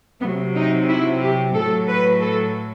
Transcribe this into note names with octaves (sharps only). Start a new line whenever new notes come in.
C3 B3
F#3
D#4
E4
G4
A2 F#3 A4
B4
A4